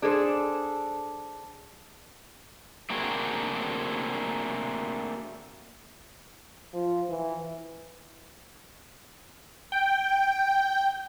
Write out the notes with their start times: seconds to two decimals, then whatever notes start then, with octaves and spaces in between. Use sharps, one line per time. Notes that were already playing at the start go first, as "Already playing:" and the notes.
0.02 D4 G#4 A4 C5
2.90 A3 A#3 C4 D4 F#4 G#4
6.74 F3
7.09 E3
9.72 G5